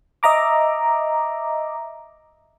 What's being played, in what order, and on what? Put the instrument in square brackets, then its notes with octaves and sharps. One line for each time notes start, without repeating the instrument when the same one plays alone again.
[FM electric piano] D#5 E5 A#5 D6